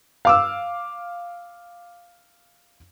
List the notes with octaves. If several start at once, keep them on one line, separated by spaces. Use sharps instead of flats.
F5 D6 E6